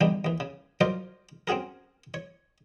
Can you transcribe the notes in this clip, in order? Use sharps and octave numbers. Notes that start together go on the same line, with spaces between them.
E2 D3 E3 G3 D4 D#4
D#2 E3
C#3
F3 F#3 D#4 A#4 C5 D5
C4 C#4 F#4 G#4 A#4
C#5